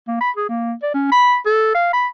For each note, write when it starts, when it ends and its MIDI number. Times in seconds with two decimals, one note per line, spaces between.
0.08 0.17 58
0.21 0.30 83
0.37 0.49 68
0.49 0.74 58
0.83 0.91 74
0.94 1.08 61
1.12 1.37 83
1.46 1.70 69
1.75 1.90 77
1.93 2.07 83